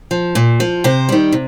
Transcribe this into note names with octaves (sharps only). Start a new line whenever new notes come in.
F3
A#2
F3
C3 C5
D#3 G3
C3